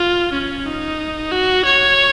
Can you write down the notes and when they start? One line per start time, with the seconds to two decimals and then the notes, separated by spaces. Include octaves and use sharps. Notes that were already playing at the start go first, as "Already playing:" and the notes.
Already playing: F4
0.33 C#4
0.65 D#4
1.31 F#4
1.65 C#5